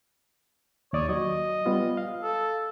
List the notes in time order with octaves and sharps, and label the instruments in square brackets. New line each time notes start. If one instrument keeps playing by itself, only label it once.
[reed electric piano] D#2 D5 D#6 [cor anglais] C#5
[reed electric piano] F#3 [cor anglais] D#5
[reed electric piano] G3 B3 F4
F5
[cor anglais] A4